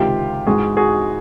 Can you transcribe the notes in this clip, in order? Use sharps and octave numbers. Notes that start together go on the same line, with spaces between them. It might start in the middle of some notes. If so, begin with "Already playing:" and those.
Already playing: C#2 C3 D#3 G#3 F4 G4
G#2 E3 G#3 F#4 G#4
F#4 G#4